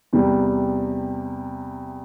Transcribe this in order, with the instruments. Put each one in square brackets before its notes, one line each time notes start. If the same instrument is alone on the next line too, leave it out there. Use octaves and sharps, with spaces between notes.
[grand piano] E2 C3 G3